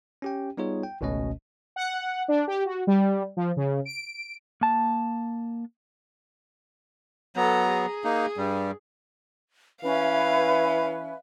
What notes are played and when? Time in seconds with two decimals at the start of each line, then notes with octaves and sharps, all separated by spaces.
0.22 C#4 G4 G5
0.57 G3 B3 D#4 F4 G#4 C#5
0.83 G5
1.01 G#1 C#2 B2 A3 C#4 D#5
1.76 F#5
2.28 D4
2.47 G4
2.66 F#4
2.87 G3
3.37 F3
3.57 C#3
3.85 D7
4.61 A#3 A5
7.36 F#3 B3 A4 A#5
7.69 G#4
8.04 A#3 D#4
8.37 G2 G3
9.83 E3 C#4 B4 E5 F5